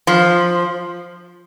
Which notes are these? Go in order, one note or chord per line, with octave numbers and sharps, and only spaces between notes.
F3